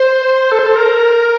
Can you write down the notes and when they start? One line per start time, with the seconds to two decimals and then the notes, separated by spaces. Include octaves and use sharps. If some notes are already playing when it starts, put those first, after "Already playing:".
Already playing: C5
0.52 A4
0.59 C5
0.66 A4
0.76 A#4